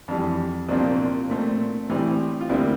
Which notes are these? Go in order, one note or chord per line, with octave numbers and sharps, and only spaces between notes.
F2 E3 G3 D4
C2 A#2 F3 C4 D4
A#2 A3 C4
A2 E3 G3 C4
F4
D2 D3 G3 A#3 C4 E4